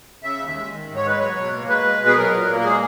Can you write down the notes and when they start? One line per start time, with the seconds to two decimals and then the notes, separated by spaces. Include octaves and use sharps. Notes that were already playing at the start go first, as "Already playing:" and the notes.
0.22 C#3 E5
0.39 D#2
0.47 E5
0.55 G#3
0.71 D#3
0.87 G#2
0.96 C#5
1.04 G#3 B4
1.19 F#3 C#5
1.36 B2
1.53 A#3
1.68 G#3 B4
1.84 G#3
2.00 B2
2.07 G#4
2.16 F#3 A#4
2.32 A#2
2.49 A#3
2.60 A#4
2.65 G#3 G#4